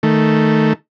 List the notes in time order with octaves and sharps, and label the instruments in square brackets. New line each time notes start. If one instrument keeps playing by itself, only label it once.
[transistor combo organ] D#3 A3